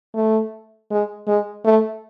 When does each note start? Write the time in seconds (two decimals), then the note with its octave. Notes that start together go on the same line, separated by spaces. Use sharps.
0.15 A3
0.91 G#3
1.27 G#3
1.65 A3